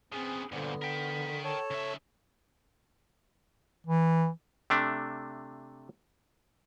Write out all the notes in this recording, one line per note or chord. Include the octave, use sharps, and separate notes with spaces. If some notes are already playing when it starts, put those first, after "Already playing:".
C#3 B3 C4 G#4
G2 A#2 D3 B3 C5
A#4 G5 B6
A4 C#5 A5
C#3 E5
E3
C3 A3 D4